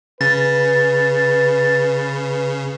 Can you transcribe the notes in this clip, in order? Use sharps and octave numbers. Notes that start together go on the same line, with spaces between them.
C#3 B4 A6